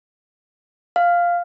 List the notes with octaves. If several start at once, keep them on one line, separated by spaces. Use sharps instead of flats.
F5